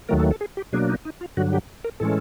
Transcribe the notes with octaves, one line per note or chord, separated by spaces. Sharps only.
D#2 D#3 F#3 A3 A#4
A4
A4
G#4
G4
B2 F#3 A#3 D4 G#4
D#4
D#4
F4
G2 D3 F#3 F#4
G4
A#4
A2 E3 G#3 C#4 A4